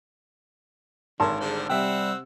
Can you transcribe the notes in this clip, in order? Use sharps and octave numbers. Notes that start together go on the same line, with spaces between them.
G#1 D3 A#4 C#5 A5 A#5 C6
D3 G3 G#4 C5
C3 G3 C4 E5 F#5 G5 E6